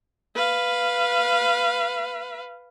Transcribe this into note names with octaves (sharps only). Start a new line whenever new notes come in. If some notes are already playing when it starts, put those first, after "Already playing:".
B4 F5